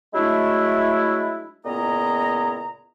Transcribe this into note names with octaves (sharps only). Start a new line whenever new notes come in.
F#3 G#3 A3 D4 E4
C#2 A#2 B3 E4 D#5 A#5